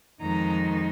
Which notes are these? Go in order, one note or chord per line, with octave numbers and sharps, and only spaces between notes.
F2 D#3 G#3 D#4 A#5